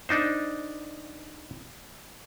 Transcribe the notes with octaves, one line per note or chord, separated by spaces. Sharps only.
D4 D#4 C5